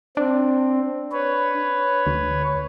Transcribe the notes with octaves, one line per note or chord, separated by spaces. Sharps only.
C4 D4
B4 C#5
D2